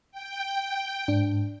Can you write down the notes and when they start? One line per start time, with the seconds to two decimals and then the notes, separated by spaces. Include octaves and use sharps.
0.11 G5
1.08 G#2 D4